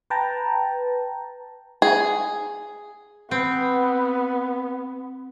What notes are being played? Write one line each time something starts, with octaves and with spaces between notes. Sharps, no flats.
B4 G5 A5 A#5
G#4
B3 C4